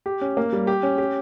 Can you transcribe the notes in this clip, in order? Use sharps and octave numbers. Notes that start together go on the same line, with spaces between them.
G4
C#4
A#3
G3
G4
C#4
G4